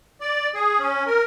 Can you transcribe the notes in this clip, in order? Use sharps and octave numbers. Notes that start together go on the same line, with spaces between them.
D5
G#4
C#4
A#4